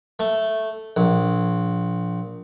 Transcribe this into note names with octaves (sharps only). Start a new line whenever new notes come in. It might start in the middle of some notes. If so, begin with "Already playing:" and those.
A3
A#1